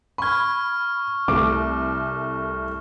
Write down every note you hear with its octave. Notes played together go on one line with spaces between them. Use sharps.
B5 C#6 F6 G#6
C2 A3 D6